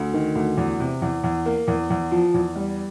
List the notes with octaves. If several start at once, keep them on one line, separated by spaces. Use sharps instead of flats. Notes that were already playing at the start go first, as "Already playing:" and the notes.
Already playing: D2
D#3
D2
E2
C3
E2
E2
A#3
E2
E2
F3
E2
G3